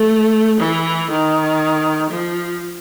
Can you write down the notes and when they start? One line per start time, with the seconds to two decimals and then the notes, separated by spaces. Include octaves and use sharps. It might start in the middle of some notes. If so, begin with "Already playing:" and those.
Already playing: A3
0.60 E3
1.10 D#3
2.10 F3